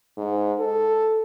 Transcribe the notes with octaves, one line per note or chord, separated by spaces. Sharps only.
G#2
A4